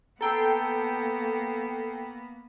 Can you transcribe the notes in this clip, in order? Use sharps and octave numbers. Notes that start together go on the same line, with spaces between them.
A#3 B3 A4 G5 A#5 E6 C7